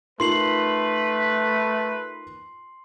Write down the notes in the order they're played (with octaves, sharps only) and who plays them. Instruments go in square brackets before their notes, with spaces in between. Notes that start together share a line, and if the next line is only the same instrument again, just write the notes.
[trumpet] A3 [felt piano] D#4 F4 A#4 [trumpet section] B4 [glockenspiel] C6 C7 F#7